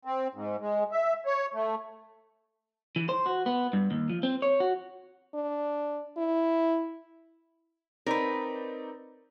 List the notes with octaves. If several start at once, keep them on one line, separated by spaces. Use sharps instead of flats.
C4
G#2
G#3
E5
C#5
A3
E3
C5
F#4
B3
G2
D#2
F3
C4
C#5
F#4
D4
E4
C4 D#4 A#4 B4 D5